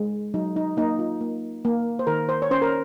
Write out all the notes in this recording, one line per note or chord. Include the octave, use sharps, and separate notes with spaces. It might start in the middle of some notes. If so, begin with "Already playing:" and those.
Already playing: G#3
F#3 D#4
D#4
A#3 D#4
F4
A#3
A#3
C5
D#3 A#4
C5
C#5
C#4 C5
A#4